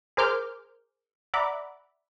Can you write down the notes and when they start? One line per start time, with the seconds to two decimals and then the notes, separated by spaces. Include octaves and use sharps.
0.17 G#4 A#4 C5 D6 F6 G6
1.34 D5 E5 F#5 A#5 B5 D6